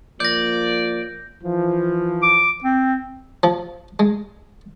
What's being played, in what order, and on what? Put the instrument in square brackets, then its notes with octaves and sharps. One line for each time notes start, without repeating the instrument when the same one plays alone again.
[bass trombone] F3 [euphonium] A#3 [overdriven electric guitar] D5 [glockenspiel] G6 A#6
[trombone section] E3 F3
[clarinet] D6
C4
[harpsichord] F3
G#3